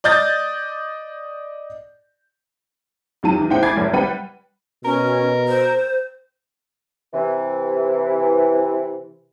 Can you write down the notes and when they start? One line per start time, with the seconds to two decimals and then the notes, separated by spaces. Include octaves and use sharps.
0.04 D5 D#5 G6 A6
3.23 F1 D#3 F#3 F4 A5 D#7
3.38 D#3 E3
3.50 A2 C5 F#5 G5
3.63 G#5 B5 D6 G#6 A6 C7
3.77 F#1 A2 A#4 C#5
3.93 G3 B4 F#5 G5 D#7
4.85 B2 C#4 A#4
5.48 C5
7.14 C3 E3